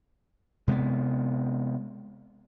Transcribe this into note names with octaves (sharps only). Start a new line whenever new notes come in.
C3 G#3 A#3 B3